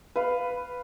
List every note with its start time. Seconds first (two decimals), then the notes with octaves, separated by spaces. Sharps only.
0.16 B4 F5